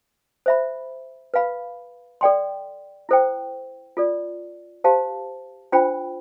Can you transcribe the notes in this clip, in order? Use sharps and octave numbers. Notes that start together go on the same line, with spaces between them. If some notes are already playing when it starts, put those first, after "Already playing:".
C5 E5 B5
B4 F5 B5
A4 D5 G5 C6
E4 A4 C5 G5
F4 A4 D5
G4 C5 F5 A5
D4 F4 C5 G5 B5